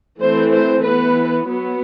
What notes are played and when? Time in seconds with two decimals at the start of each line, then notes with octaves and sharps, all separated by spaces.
0.21 E3 A3 C4 C5
0.53 C5
0.84 E3 B3 B4
1.46 F#3 B3